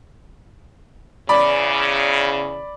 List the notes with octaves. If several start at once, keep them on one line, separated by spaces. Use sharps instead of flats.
E2 C#3 D5 B5